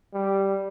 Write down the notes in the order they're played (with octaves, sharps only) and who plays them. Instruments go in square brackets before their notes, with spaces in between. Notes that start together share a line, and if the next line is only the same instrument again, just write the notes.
[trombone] G3